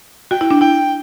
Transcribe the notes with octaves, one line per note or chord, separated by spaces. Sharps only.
F#4 G5
E4
D4
E4 G5